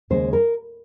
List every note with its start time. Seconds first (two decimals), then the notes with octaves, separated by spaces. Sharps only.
0.10 D#2 C#3 G#3 C5
0.33 A#4